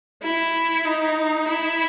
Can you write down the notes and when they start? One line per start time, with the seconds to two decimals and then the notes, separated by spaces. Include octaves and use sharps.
0.23 E4
0.85 D#4
1.48 E4